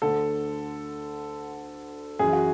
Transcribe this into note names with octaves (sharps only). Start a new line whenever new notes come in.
D2 D3 A4
F#2 E3 G#4
F#4